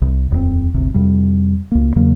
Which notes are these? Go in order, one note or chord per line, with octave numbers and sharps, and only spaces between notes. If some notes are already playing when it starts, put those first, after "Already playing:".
C2 C3
D#1 F2 G3 C4
G1 D2 C3
F2 C3 G3
C#2 A#3
E2 C#3 F#3 A#3